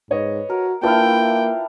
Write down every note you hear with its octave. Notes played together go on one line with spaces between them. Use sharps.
G#2 B4 C#5 D#5
F#4 A#4
A#3 D4 E4 F4 B4 F5 G5